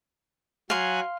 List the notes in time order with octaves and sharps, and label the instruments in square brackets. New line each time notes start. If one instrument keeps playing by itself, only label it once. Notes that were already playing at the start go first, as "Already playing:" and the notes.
[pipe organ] F#3 G#5 F#6 [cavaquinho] F5 C6